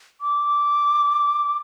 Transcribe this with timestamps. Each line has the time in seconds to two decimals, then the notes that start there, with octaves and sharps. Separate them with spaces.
0.21 D6